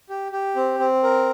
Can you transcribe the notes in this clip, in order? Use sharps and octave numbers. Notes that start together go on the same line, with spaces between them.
G4
G4
C4
C4
A#4